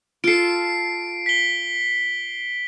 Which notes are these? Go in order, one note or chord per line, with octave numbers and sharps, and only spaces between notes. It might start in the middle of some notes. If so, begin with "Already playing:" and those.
F4 A4 C7 D7
B6 G7